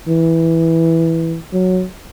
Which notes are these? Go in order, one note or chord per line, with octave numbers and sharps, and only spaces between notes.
E3
F#3